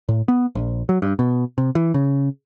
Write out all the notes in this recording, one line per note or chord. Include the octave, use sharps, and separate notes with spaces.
A2
B3
A#1
F#3
G2
B2
C3
E3
C#3